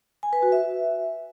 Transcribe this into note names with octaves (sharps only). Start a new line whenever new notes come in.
G#5
B4
F#4
E5